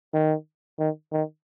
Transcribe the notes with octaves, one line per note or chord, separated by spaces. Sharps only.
D#3
D#3
D#3